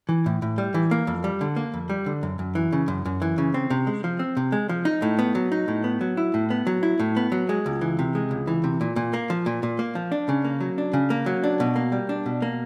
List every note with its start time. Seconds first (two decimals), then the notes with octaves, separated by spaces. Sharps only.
0.09 E3
0.26 A2
0.42 A2
0.58 G3
0.74 E3
0.91 A#3
1.07 F2
1.24 G3
1.41 D3
1.56 A#3
1.74 F2
1.90 G3
2.06 D3
2.23 F#2
2.39 F#2
2.55 E3
2.72 C#3
2.88 F#2
3.06 F#2
3.22 E3
3.38 C#3
3.54 C4
3.70 C3
3.87 G#3
4.04 F3
4.19 C4
4.37 C3
4.52 G#3
4.69 F3
4.85 D#4
5.02 A2
5.19 B3
5.35 F#3
5.52 D#4
5.68 A2
5.84 B3
6.01 F#3
6.17 E4
6.34 A2
6.50 B3
6.67 F#3
6.83 E4
7.00 A2
7.17 B3
7.32 F#3
7.49 G#3
7.66 C#2
7.81 E3
7.99 C3
8.15 G#3
8.31 C#2
8.47 E3
8.64 C3
8.81 A#2
8.96 A#2
9.14 A#3
9.30 F3
9.46 A#2
9.63 A#2
9.79 A#3
9.95 F3
10.12 D4
10.29 C#3
10.44 A#3
10.61 F#3
10.78 D4
10.93 C#3
11.10 A#3
11.26 F#3
11.44 D4
11.60 B2
11.76 A#3
11.92 G3
12.09 D4
12.26 B2
12.42 A#3